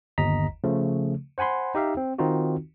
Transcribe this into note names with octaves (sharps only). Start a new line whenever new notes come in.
G1 D#2 D#5 A#5 B6
C#3 F3 A3
C5 F#5 G#5 B5 C6
D#4 G4 E5 F5
C4
D#3 C4 D#4 F4 F#4